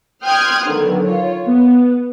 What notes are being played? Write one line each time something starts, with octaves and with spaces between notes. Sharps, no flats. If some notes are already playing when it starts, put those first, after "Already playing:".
G5 C6 D#6 F6 F#6 G#6
D3 D#3 F#3 B3
F4 C#5
B3